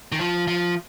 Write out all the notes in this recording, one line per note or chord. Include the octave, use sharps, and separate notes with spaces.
D#3
F3
F3